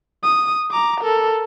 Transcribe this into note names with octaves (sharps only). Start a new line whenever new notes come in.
D#6
A#5 D6
A4 A#4